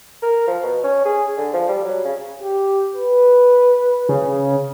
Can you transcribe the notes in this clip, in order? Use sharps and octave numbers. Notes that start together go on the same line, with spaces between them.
A#4
F3
B2
C#4
G#4
D3
F3
G3
F#3
C#3
G4
B4
C#3